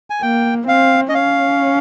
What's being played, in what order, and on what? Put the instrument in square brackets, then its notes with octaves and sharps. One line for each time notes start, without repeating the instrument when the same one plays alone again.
[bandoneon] G#5
[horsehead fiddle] A#3 [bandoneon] G5
[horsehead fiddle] C4 [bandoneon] F5
[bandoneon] D#5
[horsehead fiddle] C#4 [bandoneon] F5